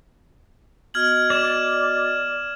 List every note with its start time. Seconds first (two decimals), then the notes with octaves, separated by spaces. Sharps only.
0.94 B3 F#4 D#5 F6 G#6 F#7
1.30 D5 G#6 E7